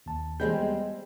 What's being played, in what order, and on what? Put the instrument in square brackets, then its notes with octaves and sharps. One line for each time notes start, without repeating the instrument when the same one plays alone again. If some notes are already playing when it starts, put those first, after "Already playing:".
[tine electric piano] D#2 A5
[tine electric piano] E3 A#3 G6 [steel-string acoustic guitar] G3 G#3 C4
[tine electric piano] B3